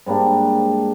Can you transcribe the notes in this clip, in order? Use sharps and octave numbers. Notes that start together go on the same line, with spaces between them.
G#2 G3 A#3 D4